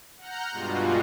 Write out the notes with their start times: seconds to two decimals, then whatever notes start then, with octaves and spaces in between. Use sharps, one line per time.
0.18 F#5 A#5 F6 G6
0.51 G2 B2 G3 G#3 F4 F#4